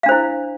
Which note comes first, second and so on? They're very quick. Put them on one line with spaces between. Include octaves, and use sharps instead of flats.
F5 D4 C5 E4